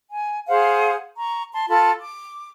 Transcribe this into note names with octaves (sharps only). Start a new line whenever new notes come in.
G#5
G#4 C5 F5 F#5
A#5 C#6
A5 C6
F4 A4 A5 B5
D6